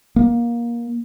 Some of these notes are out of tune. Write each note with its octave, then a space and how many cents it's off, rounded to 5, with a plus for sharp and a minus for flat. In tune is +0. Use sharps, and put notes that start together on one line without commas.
A#3 +20